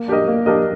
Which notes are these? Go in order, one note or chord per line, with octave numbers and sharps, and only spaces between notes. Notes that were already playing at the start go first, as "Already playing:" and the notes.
Already playing: A#3
D4 G4 A#4 D#5
A#3
D4 G4 A#4 D#5